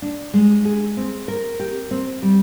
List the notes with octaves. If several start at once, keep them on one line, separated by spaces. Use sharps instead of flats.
D4
G#3
G#4
C4
A#4
G4
C4
G3